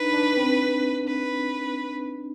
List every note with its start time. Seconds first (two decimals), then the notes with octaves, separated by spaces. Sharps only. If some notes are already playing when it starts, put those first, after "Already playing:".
Already playing: D4 D#4 B4
0.13 D4
0.37 C4
1.08 B4